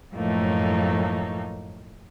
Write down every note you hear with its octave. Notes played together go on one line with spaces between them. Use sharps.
F#2 A2 F3 A3 A#3 D#4